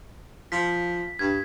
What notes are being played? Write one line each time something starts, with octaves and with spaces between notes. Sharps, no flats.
F3 B6
G2 G#6